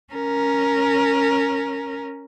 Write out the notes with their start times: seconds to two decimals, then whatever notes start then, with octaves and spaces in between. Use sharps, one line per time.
0.14 C#4 A#4